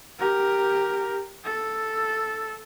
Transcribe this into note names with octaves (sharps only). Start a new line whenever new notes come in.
G4 A#4
A4